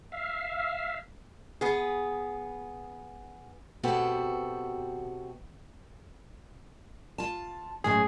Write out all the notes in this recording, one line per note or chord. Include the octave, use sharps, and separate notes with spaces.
E5 F5
B3 G#4
B2 B3 C4 F#4 G4 A4
F4 A5
F#2 A2 G#3 G#4